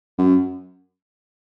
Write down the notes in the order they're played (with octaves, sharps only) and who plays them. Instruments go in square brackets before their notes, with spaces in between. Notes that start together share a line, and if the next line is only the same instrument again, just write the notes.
[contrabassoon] F#2